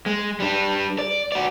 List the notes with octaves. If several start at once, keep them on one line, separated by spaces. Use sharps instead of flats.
G#3
G3 D4
D5
F#4 D5